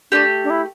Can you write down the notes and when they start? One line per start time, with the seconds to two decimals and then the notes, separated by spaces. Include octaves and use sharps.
0.11 A3 C4 D4 G4
0.44 D4
0.50 E4